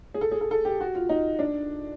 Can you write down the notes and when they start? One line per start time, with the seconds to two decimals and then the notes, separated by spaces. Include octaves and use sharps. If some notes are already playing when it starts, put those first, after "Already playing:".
0.14 G#4
0.21 A4
0.31 G#4
0.41 A4
0.51 A4
0.65 G4
0.81 F#4
0.95 F4
1.09 D#4
1.39 D4